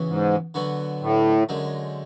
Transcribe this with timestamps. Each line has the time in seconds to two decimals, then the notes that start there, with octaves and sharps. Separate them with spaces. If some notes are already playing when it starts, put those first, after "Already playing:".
Already playing: C#3 E3 B3 F#4
0.08 G#2
0.54 D3 F#3 B3 F#4
1.01 A2
1.49 F#2 D3 G#3